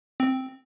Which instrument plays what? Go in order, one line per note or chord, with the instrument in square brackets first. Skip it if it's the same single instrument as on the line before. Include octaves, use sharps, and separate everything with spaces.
[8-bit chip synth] C4